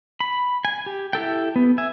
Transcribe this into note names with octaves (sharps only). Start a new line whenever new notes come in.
B5
G#5
G4
E4 G4 A4 G5
B3
E5 G#5